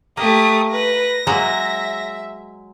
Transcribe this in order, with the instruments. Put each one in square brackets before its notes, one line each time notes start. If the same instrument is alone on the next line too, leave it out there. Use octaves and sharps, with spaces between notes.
[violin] A3 G4 [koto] A#3 [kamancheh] D#6
[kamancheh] B4 [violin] A#6
[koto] F#3 G#3 A#3 [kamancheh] E5